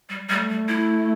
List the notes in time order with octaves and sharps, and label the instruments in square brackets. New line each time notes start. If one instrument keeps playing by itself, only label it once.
[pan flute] G3
[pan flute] G3 [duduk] A3
[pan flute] G3
E4